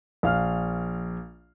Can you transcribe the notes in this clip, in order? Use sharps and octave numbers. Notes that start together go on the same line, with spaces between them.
A#1 F5 F6